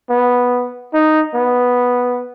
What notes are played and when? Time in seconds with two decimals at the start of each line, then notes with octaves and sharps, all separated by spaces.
0.10 B3
0.93 D#4
1.35 B3